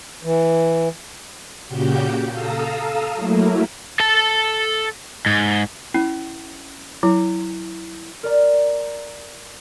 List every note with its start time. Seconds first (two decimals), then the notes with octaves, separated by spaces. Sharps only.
0.23 E3
1.68 A#2 C#3 F#4 G4 G6
2.30 A4 F5 A#5 D#6 E6
3.14 F#3 A3 A#3 E4
4.00 A4 A5
5.26 G#2
5.94 C#4 E4
7.03 F#3 E4
8.23 A#4 D5 A#5